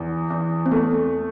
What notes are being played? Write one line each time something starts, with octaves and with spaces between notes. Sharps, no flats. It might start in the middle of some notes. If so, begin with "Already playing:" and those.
Already playing: E2
E2
C4
A3 B3